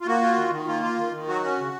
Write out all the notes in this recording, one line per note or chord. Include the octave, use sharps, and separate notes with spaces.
F4
A#3 F#4
F4
D#3
D#3
A#3 F4
F4
D#3
D#3
F#3 F#4
C#4
C#3